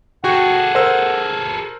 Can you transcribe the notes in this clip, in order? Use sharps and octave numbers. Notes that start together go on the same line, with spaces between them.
F#4 G#4 A4 F#5 G5 C#6
A#4 C5 E6